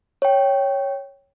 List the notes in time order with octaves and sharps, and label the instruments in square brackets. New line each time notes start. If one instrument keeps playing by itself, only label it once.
[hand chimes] C#5 G5